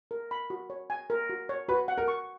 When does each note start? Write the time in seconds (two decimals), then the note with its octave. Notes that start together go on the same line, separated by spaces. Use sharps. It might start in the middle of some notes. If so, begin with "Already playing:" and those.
0.11 A#4
0.31 B5
0.50 F#4
0.70 C#5
0.90 G#5
1.10 A#4
1.30 F#4
1.49 C#5
1.69 F#4 B4
1.88 F#5
1.98 A#4
2.08 C#6